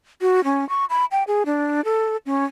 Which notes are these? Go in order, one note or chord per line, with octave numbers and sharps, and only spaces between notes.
F#4
C#4
C#6
B5
G5
G#4
D4
A4
C#4